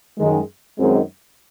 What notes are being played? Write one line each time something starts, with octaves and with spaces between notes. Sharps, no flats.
F#2 D#3 G#3
F#2 D#3 G#3 C4 D#4